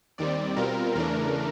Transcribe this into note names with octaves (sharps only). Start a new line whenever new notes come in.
D#2 D#3 G3 C4 D5
B2 G3 C4 F4 A#4
E2 C#3 E3 A3 D4 A#4